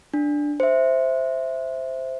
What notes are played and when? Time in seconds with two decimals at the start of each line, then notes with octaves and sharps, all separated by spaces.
0.14 D4
0.60 C5 E5